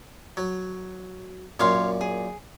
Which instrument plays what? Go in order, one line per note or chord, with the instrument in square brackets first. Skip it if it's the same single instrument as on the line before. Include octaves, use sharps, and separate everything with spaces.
[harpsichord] F#3
[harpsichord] F#2 A#2 [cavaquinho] C#5 F5 C6
[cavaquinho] G#4